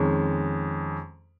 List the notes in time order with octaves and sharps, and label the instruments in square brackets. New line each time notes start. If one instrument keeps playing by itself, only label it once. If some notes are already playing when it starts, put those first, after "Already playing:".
Already playing: [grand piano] F2 D#3 G#3 C#4